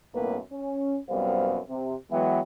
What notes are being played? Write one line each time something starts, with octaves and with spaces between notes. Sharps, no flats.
B1 F#2 A2 A#3 B3 B4
C#4
C2 F#2 G3 B3 C5 F5
C3
E3 F#3 G#3 B3 E5 G5